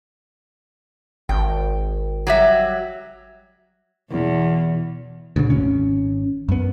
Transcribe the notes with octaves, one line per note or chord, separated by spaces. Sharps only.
G#1 G5
F#3 G3 E5
E2 B2
D2 A#2 C#3
G#1 C#4
F#2 B3